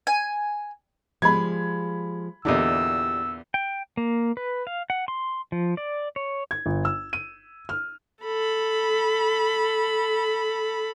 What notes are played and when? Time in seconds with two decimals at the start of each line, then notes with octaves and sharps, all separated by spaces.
0.07 G#5
1.22 F3 G3 G#3 B5 G#6
2.45 E2 A#2 D3 E4 G4 D#5 E6
3.54 G5
3.97 A#3
4.37 B4
4.67 F5
4.90 F#5
5.08 C6
5.52 F3
5.77 D5
6.16 C#5
6.51 G#6
6.66 G1
6.85 E6
7.13 D#7
7.69 F6
8.23 A4 B5